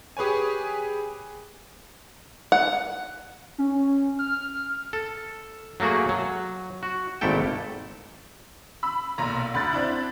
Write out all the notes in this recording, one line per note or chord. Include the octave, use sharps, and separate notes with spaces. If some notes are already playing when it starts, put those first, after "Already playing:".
G4 G#4 B4 C#5 G#5
F#5
C#4
F6
A4
F#3 A3 A#3 F#4 G#4
F#3
F#4
G#1 A#2 A3 E4 A4 G5
B5 E6
B1 A#2 A#5
D2 B5 F#6 A6
C4 D4 E4